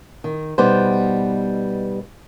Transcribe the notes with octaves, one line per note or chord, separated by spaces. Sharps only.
D#3
B2 G3 B3 D#4 C5